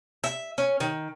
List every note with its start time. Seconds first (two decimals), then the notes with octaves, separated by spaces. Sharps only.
0.24 E5
0.58 C#4
0.80 D#3